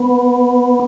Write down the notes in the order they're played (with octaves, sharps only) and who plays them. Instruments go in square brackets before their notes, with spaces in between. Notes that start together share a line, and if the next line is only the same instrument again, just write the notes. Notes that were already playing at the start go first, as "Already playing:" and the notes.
Already playing: [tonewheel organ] B3